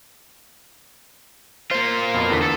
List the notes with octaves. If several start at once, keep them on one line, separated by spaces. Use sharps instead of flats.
A#3 F4 C5
F2 B2
E2 D3 B6
A4